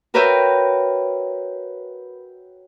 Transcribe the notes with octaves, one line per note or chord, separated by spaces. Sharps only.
F#4 A#4 B4 C#5 E5 G5